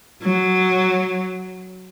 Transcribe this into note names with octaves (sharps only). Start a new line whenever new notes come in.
F#3